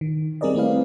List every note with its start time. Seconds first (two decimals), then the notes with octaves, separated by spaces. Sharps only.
0.01 D#3
0.41 G3 C4 G#4 A#4 D5 D#5
0.55 A3 C4 E4 B4 F5